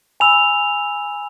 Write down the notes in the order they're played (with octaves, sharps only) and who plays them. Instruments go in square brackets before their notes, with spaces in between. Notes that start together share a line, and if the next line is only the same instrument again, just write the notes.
[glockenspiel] G#5 B5 E6 F7